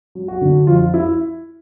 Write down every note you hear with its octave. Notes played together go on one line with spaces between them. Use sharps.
F#3
F#4
D3
F2 F4
E4